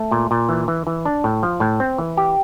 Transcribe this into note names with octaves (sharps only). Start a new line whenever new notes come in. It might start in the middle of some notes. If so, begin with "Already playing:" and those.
Already playing: A3
A#2
A#2
E3
E3
E3
D4
A2
F3
A2
C4
E3
G4